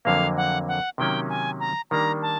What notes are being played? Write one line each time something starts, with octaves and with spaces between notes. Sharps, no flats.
F2 D3 F#3 A#3 F5
F#5
F#5
C3 D#3 F#3 A#3 C#4 G5
G#5
A#5
D#3 G3 A#3 D4 A#5
A5